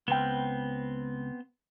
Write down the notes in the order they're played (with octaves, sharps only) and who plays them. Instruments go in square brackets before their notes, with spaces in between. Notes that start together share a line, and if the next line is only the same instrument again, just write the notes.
[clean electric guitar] C#2 G5 [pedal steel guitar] B3 C4